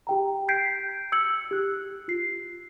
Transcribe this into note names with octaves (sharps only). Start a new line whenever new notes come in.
G4 G5 A#5
G6 G#6 B6 C7 D7
E6 G#6 C#7 F#7
G4 F#6
F4 C7